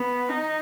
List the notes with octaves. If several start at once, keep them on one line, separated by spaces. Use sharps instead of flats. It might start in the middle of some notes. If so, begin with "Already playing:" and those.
Already playing: B3
D#4